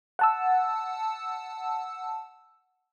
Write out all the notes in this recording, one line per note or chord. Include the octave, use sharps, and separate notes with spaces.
F#5 A5 E6